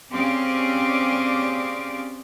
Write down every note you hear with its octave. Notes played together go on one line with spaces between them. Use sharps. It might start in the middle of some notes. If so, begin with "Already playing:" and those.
C4 C#4 G4 G#4 D5 F5